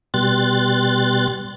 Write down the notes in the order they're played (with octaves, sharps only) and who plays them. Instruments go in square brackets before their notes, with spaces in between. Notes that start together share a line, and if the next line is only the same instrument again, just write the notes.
[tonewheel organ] B2 G3 C6 F#6 A6